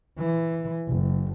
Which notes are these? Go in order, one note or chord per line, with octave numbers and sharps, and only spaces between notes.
E3
F#1